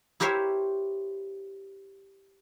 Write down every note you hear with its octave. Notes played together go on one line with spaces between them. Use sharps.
E4 G4 A#4 C5 C#5 E5